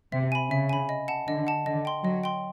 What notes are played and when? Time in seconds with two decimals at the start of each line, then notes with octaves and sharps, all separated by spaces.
0.12 C3 E5
0.32 G#5 B5
0.50 C#3 E5
0.69 G#5 B5
0.89 D#5
1.08 F#5 A5
1.28 D3 D#5
1.47 F#5 A5
1.66 D3 D#5
1.85 G5 C6
2.04 F#3 D#5
2.24 G5 C6